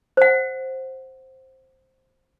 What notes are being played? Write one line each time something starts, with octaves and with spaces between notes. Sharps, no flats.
C5 F#5